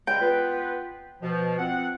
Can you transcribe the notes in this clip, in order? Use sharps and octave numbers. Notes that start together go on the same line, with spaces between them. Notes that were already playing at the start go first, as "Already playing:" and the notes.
C#3 G3 G#3 G5
B3 F4 B4
B2 F3
F3 C4 F#5